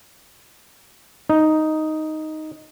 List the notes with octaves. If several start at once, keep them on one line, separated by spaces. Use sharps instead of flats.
D#4